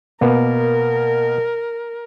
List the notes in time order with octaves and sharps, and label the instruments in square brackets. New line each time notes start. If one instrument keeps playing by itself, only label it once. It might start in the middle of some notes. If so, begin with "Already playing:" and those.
[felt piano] B2 [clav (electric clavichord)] A#3 B3 [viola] A#4